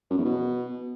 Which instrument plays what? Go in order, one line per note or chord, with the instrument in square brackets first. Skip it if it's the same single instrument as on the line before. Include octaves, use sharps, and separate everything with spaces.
[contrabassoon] F#2
E2
B2